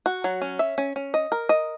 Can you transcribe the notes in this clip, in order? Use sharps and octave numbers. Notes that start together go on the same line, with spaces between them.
F#4
F#3
C#4
E5
C#4
C#4
D#5
A#4
D#5